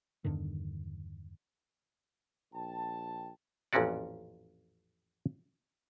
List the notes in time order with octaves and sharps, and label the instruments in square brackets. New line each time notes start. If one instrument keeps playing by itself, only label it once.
[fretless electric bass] E2 G2 D3 D#3
[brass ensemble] A#1 G5 A5
[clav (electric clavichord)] A1 F2 A#2 C#4 F#4 D5